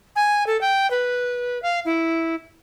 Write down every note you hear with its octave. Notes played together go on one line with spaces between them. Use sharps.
G#5
A4
G5
B4
F5
E4